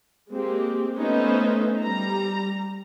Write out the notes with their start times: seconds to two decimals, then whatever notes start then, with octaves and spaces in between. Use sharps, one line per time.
0.32 G#3 A#3 C4 G4
0.97 A3 B3 C#4 D#4 C5 E5
1.81 G3 A#5